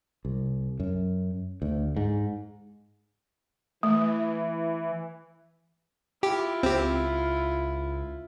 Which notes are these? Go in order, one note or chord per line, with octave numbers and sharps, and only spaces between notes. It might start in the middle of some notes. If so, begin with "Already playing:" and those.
C2
F#2
D2
G#2
E3 A3
E4 F4 G4
C#2 C4 G4